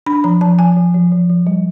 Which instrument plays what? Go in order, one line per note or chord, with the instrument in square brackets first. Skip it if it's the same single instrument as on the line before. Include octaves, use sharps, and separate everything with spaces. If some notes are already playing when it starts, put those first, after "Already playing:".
[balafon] D4 B5
F3 A#5
F3 A5
F3 G#5
F3
F3
F3
F3
G3